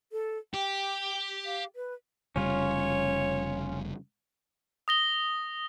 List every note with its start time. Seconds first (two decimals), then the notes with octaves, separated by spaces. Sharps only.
0.12 A4
0.54 G4 G5
1.46 F5
1.76 B4
2.36 F1 C#3 G3 C#4 F4 C#5
4.88 D#6 A#6 G7